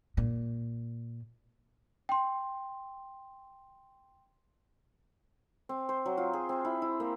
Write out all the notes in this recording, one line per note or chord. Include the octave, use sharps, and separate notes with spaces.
A#2
G5 C6
C4
C5
F#3
F4
G#4
C4
E4
E4
A#3